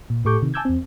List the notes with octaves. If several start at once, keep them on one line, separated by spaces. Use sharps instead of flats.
A#2
A2 G4 A4 C#6 D6 G6
C3 D#3
G#5 A5 D6 E6 G6 G#6
E2 C4